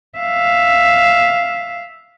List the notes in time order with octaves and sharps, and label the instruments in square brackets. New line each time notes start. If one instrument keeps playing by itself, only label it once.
[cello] E5 F5